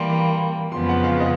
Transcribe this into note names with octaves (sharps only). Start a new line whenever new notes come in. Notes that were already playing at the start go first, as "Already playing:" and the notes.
Already playing: E3 G3 A#3 C6
B5
F2 C#3 F3 G#3 B3 C6
F#5
F5
D#5